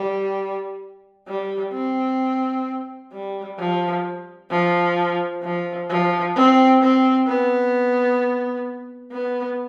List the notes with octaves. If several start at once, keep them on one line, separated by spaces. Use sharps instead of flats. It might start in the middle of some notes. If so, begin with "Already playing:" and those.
Already playing: G3
G3
C4
G3
F3
F3
F3
F3
C4
C4
B3
B3